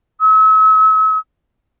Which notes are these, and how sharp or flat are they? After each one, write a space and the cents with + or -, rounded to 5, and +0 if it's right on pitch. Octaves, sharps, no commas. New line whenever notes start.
E6 -40